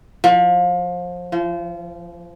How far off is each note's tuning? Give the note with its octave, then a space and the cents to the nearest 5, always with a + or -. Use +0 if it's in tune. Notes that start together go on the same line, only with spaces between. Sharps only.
F3 +25
F3 -30